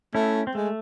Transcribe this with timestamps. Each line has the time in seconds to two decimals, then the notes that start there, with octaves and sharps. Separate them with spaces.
0.14 A3 C#4 E4
0.47 C4
0.55 G#3 A3